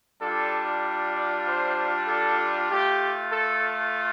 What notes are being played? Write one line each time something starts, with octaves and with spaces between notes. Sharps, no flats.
G3 D4 F4 A4
D5
C5
A4
A3 F4 G4
A4